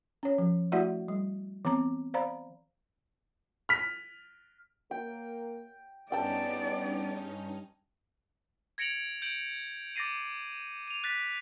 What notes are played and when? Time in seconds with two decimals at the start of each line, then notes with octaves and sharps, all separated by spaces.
0.23 C#4 C#5
0.38 F3
0.72 A3 E4 F#4 D5 E5 F#5
1.08 G3
1.65 E3 B3 C4 A#5 D6
2.14 C5 D5 F5 A#5 B5
3.69 F6 B6
4.91 A#3 A#4 G5
6.12 G2 B3 C#4 D#4 G#4 D5 G5 A5
8.78 G#6 A#6 C#7 D7 F7 F#7
9.22 G6 D7 F#7
9.96 D6 A6 A#6 C7 D#7
10.88 D#7 F7
11.04 F#6 A6 B6